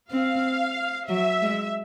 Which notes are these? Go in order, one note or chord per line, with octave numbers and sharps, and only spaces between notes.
C4 F5
F#3 E5
G#3